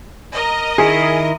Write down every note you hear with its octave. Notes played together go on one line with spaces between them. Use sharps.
A#4 D#5
D#3 E4 G#4